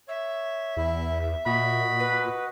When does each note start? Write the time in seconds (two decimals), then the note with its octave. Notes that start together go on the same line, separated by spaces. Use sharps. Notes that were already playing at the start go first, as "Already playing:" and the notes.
0.08 C#5 E5
0.77 E2 E4
1.46 A#2 F#4 D#5 B5
1.99 B4